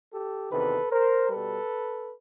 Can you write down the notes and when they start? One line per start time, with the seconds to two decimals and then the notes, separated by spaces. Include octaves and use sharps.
0.12 G4 A4
0.51 E2 C3 D#3 A4 B4
0.91 A#4 C5
1.29 B2 G3 A4 B4